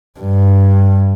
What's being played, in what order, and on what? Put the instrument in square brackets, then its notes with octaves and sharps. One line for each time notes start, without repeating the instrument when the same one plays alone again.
[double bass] G2